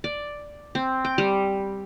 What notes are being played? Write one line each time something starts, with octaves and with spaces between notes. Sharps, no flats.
D5
C4
G5
G3